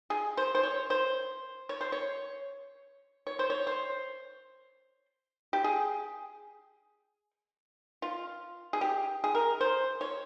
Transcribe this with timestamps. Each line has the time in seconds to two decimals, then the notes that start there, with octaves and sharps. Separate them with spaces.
0.10 G#4
0.37 C5
0.55 C5
0.63 C#5
0.90 C5
1.69 C#5
1.81 C5
1.92 C#5
3.27 C#5
3.39 C5
3.50 C#5
3.67 C5
5.53 G4
5.64 G#4
8.02 F4
8.73 G#4
8.81 G4
9.24 G#4
9.35 A#4
9.61 C5
10.01 C#5